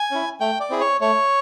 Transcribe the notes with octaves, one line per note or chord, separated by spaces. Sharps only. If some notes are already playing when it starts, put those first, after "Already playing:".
Already playing: G#5
C#4 E4
A3 G5
D5
C4 E4 G#4
C#5
A3 C#5